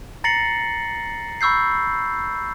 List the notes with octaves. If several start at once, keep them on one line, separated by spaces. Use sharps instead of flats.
A#5 A6 A#6 C7 C#7 F#7
B5 C#6 E6 G6 C7